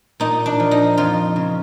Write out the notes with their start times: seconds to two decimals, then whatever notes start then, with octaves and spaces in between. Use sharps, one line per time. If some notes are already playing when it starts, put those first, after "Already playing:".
0.20 A#2 D#4
0.46 D4
0.60 F3
0.71 D#4
0.97 F2 F4
1.36 C#3